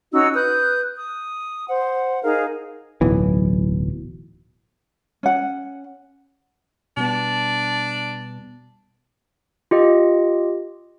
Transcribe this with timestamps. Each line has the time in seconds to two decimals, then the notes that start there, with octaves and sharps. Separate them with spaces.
0.13 C#4 D#4 F#4 E6
0.34 B4 D#6 F#6 G6
0.97 D#6
1.69 C5 F#5
2.23 D#4 G#4 A#4 F5
3.01 D1 B1 E3
5.23 C#4 F#5
6.97 B2 G3 B3 D4
9.71 F4 G4 D#5